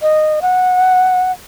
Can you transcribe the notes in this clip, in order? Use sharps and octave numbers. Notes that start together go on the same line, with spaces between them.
D#5
F#5